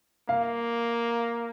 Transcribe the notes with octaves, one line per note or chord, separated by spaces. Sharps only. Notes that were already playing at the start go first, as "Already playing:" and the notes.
A#3 F5